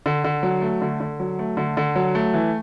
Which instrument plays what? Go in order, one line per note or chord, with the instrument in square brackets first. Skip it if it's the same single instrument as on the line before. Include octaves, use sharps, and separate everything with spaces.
[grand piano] D3
D3
F#3
A3
D3
D3
F#3
A3
D3
D3
F#3
A3
E3